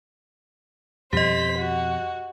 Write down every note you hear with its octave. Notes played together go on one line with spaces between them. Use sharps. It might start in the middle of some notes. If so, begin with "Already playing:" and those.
F2 B2 G3 G4 C5 D#5 B6
F#4